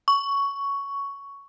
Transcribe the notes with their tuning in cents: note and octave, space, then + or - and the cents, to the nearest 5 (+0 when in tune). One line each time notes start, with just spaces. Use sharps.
C#6 +10